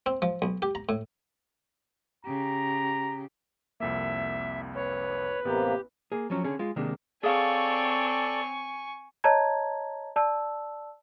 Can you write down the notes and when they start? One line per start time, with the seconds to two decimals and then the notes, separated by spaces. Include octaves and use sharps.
0.06 C4
0.22 F3
0.42 B1
0.62 G4
0.75 A#5
0.89 A2
2.25 C#3 G4 A#5
3.80 C2 F2 A#3 E5
4.75 B4 C#5
5.45 A1 C3 A#3 B3 G4
6.12 A#3 G#4
6.30 F3 F#3 C#4
6.44 D3 C#4 G#4
6.59 G#3 F4
6.76 C3 D#3 G#3 A#3 D4
7.23 C4 G#4 A4 C#5 D5 F5 G#5 C#6
9.24 C#5 D#5 A5 A#5 G#6
10.16 D5 A5 E6